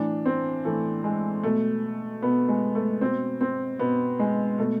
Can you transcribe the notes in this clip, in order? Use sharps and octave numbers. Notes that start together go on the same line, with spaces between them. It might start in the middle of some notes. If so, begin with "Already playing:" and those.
Already playing: A2 E3 D4
C4
A2 E3 A3
G#3
B2 A3
B2 B3
G#3
A3
B2 C4
C4
B2 B3
G#3
B2 A3